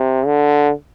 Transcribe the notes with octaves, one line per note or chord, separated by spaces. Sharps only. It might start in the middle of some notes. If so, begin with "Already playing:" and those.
Already playing: C3
D3